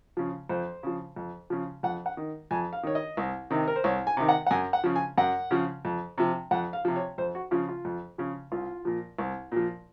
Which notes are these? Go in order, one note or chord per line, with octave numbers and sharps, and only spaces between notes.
C#3 F3
F2 C5
C#3 F3
F2
C#3 F3
F2 F#5
F#5
D#3
F2 G#5
F5
D#3 C#5
D#5
C2
C3 D#3
A#4
C5
C2 C#5
G#5
C3 D#3
F#5
F#5
F#2 G#5
F#5
C#3 F3
G#5
F#2 F#5
C#3 F3
F2
C3 F3
F2 F#5
F5
C3 F3
C#5
F2 C5
F#4
C#3 F3 F4
F4
F2
C#3 F3
C2 F4
A#2 F3
C2
A#2 F3